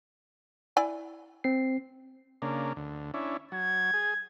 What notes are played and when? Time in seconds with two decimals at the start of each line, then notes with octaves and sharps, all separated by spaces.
0.77 E4 D5 G#5
1.44 C4 C7
2.42 C#3 A#3 D4
2.76 D2
3.14 C#4 D4 E4
3.52 F#3 G#6
3.94 G#4